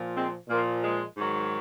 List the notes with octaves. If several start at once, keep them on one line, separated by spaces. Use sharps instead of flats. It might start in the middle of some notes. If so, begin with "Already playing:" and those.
Already playing: A#2 F3
G#3 C4
A#2 F3 A#3
G#3
G#2 D#3 F#3